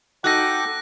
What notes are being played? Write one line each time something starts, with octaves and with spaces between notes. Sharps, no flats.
D#4 F#4 A4 G5 D6 F#6 A#6